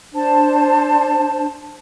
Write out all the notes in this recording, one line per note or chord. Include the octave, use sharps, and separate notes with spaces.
D4 C5 A5